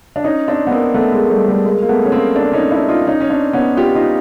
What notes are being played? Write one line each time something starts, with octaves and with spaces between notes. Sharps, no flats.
D4
C#4 D#4
C4 D4
B3
A#3 C4
A3 B3
G#3 A#3
G3 A3
G3 A3
G#3 A#3
A#3
A3 B3
C#4
A#3 C4
C4 D4
C#4 D#4
D4 E4
D#4 F4
C#4 D#4
C#4
C4 D4
B3 C#4
F4 G4
D#4 F4